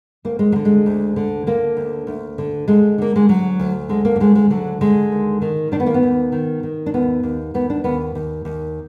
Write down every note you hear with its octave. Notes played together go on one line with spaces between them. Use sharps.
D2 A#3
G#3
F#3
D3
G#3
D2
D3
D3 A#3
D2
D2
D3
D3 G#3
D3 A#3
G#3
D2 F#3
D2
D3 G#3
A#3
F#3
D2 G#3
G#3
D3 F#3
D3 G#3
D#2
D#3
D#3 D4
B3
A#3
B3
D#2
D#3
D#3
D4
D#2 B3
D#2
D#2 B3
D4
D#2 B3
D#2
D#2